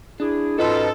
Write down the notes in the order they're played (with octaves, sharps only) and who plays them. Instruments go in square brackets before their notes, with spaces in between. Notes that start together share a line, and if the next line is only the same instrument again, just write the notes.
[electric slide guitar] D4 [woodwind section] E4 G#4
[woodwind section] G#2 C#4 F4 [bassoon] D#4 [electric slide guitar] F#4 B4 [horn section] A4